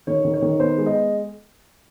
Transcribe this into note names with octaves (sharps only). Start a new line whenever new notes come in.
D#3 C#5
D#3
C#5
D#3
B3 C5
G#3
D#5